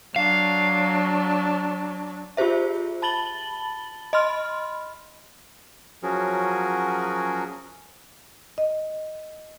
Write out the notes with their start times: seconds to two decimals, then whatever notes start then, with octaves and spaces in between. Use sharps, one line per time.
0.16 F#3 D4 F5
2.37 F4 G4 G#4 C5 E5
3.02 A5 B5 A6 F#7 G7
4.13 D#5 B5 C6 F6
6.03 F3 F#3 C#4 F#4 G#4 A#4
8.58 D#5